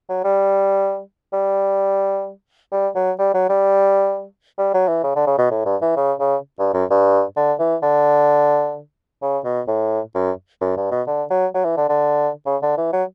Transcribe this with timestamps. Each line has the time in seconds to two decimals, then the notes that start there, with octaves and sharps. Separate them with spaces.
0.09 F#3
0.24 G3
1.33 G3
2.72 G3
2.95 F#3
3.19 G3
3.34 F#3
3.49 G3
4.58 G3
4.74 F#3
4.88 E3
5.03 C#3
5.15 D3
5.27 C#3
5.38 B2
5.51 A2
5.65 G2
5.82 E3
5.96 C#3
6.20 C#3
6.59 G2
6.74 F#2
6.90 G2
7.37 D3
7.59 E3
7.82 D3
9.22 C#3
9.44 B2
9.67 A2
10.15 F#2
10.61 F#2
10.77 G2
10.91 B2
11.07 D3
11.30 F#3
11.54 F#3
11.65 E3
11.77 D3
11.89 D3
12.46 C#3
12.62 D3
12.78 E3
12.93 F#3